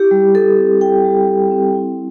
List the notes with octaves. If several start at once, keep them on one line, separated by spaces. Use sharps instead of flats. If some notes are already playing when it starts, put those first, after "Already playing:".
Already playing: E4 G4
G3
G3 A4
C4
E4 G5
G3
G3
C4
E4